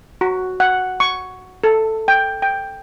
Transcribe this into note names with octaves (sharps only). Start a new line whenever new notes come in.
F#4
F#5
C#6
A4
G5
G5